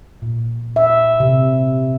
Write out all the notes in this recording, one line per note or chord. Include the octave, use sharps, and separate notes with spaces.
A#2
E5
C3